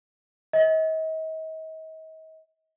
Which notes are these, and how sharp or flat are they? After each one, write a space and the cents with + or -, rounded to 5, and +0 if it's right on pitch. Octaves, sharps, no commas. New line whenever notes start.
D#5 +40